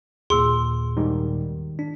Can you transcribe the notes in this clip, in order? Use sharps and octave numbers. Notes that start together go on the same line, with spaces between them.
D#2 A#2 G#4 C6 E6
G#2 D#3 G3
D4